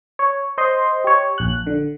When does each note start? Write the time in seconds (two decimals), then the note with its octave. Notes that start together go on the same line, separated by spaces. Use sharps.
0.19 C#5
0.58 C5 D#5 C6
1.04 G4 C#5
1.38 A#1 F#6
1.67 D3